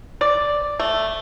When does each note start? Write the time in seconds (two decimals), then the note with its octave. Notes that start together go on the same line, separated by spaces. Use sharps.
0.21 D5
0.79 A3